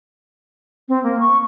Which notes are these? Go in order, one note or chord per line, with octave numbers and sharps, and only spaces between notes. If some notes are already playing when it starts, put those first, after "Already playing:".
C4
A#3
C#6